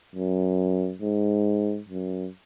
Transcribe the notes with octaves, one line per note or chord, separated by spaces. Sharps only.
F#2
G#2
F#2